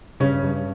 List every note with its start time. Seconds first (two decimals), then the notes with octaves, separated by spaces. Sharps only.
0.20 G2 C#3 C#4
0.43 G2